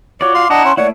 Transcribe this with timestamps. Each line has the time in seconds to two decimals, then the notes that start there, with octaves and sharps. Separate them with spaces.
0.21 F4 F#4 C#5 D5 D6
0.35 F5 C6
0.50 D4 E4 D#5 F#5 A5 A#5
0.65 C#4 C6
0.77 A3 A#3 E4 C#5 D5 F#5